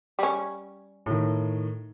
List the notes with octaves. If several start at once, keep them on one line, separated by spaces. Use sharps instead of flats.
G3 C#4
A2 D#3